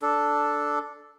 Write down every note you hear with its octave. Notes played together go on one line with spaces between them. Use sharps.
D4 A4